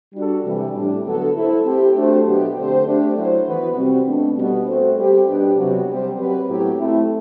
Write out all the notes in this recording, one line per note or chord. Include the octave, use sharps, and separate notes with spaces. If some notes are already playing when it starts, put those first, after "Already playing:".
G3 D4 F#4 A4
C3 E3 G3
A2 G3 D4
D3 F#3 B3 F#4 A4
A3 E4 A4 C5
A3 C4 G4
A3 D4 F#4 C5
B2 F#3 B3 D4 G4
D3 A3 C4 G4 C5
A3 D4 G4
F#3 A3 E4 A4 C5
E3 B3 F#4 B4
C3 G3 C4 F#4
B2 A3 D4 A4
B2 G3 B3
A3 C4 F#4 A4 C5
G3 C4 G4 C5
B2 G3 B3 D4 G4
C3 F#3 B3 F#4
C3 G3 C4 G4 C5
F#3 C4 G4 B4
A2 F#3 B3 E4 G4
A3 C4 E4